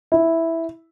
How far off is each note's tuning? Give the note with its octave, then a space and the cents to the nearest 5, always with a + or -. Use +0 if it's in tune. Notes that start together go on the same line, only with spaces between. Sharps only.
E4 -5